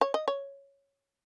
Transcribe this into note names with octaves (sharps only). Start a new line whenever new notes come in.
C#5
D#5
C#5